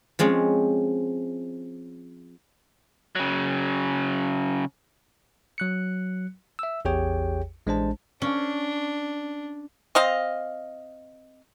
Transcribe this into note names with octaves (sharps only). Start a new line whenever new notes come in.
F3 G#3 C4 C#4
C#3 F#3
F#3 F#6 C#7
E5 E6
A1 E2 G4 G#4 C#5 G5
A1 G#3 D4 C5 A5
C#4 D4
C4 D#5 F5